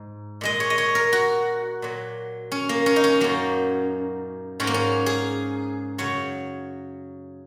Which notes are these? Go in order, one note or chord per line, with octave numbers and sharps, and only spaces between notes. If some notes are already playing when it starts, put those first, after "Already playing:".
Already playing: G#2
A#2 G#3 D#5
C#5
D#5
C#5
A#4
F#4
A#2 F#3
C#4
A#3
C#4
D#4
C#4
F#2 F#3 A#3
G#2 F#3 C#4
A#3
C#4
G#4
F#2 C#3 F#3 C#5